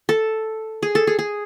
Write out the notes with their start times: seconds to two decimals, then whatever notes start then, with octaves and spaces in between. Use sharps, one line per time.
0.09 A4
0.83 G#4
0.95 A4
1.07 G#4
1.19 G#4